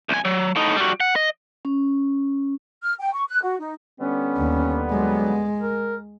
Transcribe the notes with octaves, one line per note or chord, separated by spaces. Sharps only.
C2 G#5
F#3
A2 D#4
G3 F#4
F#5
D#5
C#4
F6
G5
C#6
F#6
F#4
D#4
D3 G3 B3 C#4
D#2
F#3 G#3
A#4